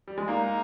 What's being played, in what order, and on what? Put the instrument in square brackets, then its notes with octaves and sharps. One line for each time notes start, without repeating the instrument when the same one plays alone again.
[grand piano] G3
G#3
[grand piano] A#3 [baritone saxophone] D#4